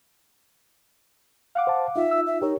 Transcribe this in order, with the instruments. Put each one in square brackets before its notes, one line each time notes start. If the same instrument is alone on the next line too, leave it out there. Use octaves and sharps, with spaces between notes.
[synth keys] F5 F#5 D6
[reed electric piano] C5 A5
[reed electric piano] D#4 F4 [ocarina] E5
[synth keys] E6
[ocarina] E5
[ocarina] D#4 [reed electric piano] G4 A#4 C#5